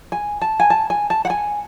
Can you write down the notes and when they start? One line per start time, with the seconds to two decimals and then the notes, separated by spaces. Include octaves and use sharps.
0.12 G#5
0.41 A5
0.60 G#5
0.70 A5
0.90 G#5
1.10 A5
1.25 F#5
1.30 G#5